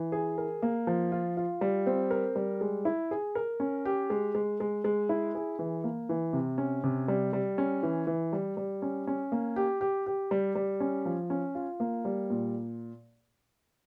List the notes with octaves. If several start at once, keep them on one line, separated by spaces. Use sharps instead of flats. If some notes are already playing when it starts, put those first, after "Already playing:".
Already playing: E3
G#4
A#4
A#3
F3
F4
F4
G3
C4
A#4
G3
G#3
E4
G#4
A#4
C#4
G4
G#3
G#3
G#3
G#3
E4
G#4
E3
A#3
E3
C3
C#4
C3
G3
G3
C#4
E3
E3
G3
G3
C#4
C#4
A#3
G4
G4
G4
G3
G3
C#4
F3
C#4
F4
A#3
G3
A#2